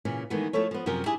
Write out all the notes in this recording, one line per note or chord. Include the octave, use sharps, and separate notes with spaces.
A#2 C#3 E3
D#3 E3 G#3 A3 B3
F3 A3 E4 A4 C#5
F3 B3
F#2 C3 F3 A#4 G5
D4 E4 G4 G#4 E5 G#5